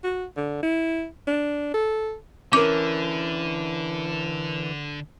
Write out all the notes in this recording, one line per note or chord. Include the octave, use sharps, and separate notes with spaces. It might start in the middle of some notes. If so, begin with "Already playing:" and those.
F#4
D3
E4
D4
A4
D3 E3 C#4 A#4 D6